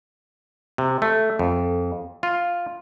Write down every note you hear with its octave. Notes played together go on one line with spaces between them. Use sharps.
C3
A3
F2
F4